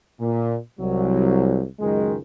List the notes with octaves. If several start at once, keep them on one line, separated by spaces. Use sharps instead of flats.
A#2
C2 F#3
C#2 F#2 D#3 G#3